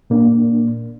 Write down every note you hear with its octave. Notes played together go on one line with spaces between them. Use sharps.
A#2 A#3 D4